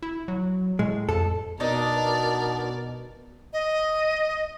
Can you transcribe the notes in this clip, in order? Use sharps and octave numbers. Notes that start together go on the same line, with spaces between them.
E4
F#3
A2 G#3
F2 A4
B2 D4 D#4 A#4 D5
D#5